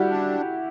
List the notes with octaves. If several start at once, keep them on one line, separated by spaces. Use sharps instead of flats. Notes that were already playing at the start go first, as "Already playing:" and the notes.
Already playing: G3 E4 F#4 G4
D4